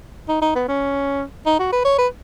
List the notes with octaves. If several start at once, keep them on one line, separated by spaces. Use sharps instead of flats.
D#4
D#4
B3
C#4
D#4
F#4
B4
C#5
B4